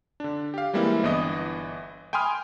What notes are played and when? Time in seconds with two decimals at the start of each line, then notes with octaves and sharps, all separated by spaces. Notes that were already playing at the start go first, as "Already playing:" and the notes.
0.20 D3 D4
0.54 G4 F5
0.73 E3 G3 G#3 A#3 C4 E4
1.03 G1 E3 B3 D4 D#5
2.13 G5 G#5 B5 C6 D#6 F6